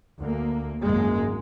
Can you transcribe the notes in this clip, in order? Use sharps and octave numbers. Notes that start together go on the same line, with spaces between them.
D2 A#3
G#1 F#2 G#3 A#3